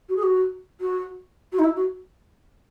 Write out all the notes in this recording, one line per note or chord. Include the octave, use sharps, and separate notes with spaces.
F#4
G#4
F#4
F#4
F#4
D#4
E4
F#4